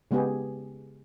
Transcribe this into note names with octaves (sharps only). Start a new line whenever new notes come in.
C#3 G#3 B3 G4 G#4